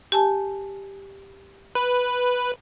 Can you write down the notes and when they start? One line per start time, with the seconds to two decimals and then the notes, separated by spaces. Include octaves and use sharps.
0.12 G4 G#5 A5
1.75 B4